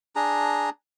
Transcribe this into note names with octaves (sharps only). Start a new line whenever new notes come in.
D4 G#4 A#5